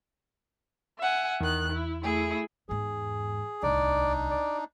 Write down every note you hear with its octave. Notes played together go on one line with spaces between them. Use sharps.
E5 F#5 G#5
E2 D#3 F#6
E4
A3 E4 G#4
E2 G#2 G#4
D1 C2 D4 D#4 D5
D5